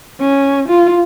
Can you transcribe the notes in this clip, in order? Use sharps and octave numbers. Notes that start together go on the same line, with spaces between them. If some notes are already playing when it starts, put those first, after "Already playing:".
C#4
F4